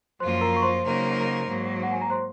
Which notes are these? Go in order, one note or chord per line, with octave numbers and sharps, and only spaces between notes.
F#2 F3 A#3 F4 C5 C6
A#4 A#5
C#6
C5 C6
C#3 F#3 A#3 D#4 A#4
G#2 F#3 A#3
F#5
G#5
A#5
C5 C6